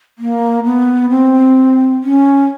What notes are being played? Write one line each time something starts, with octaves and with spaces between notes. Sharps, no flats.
A#3
B3
C4
C#4